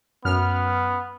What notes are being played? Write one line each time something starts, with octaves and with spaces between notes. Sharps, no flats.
F#2 B3 F6